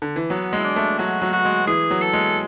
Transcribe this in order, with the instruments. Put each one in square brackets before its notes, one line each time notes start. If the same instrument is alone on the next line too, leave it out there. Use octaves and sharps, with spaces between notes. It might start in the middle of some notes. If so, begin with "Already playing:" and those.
[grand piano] D3
E3
[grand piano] F#3 [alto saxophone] B3
[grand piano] G#3 [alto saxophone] E4
[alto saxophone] D4
[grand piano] A3
[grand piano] F#3 [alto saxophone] F#4
[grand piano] F#3
[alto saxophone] F#4
[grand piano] G#3
[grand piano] E3 [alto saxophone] G#4
[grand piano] F#3
[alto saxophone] A4
[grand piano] G#3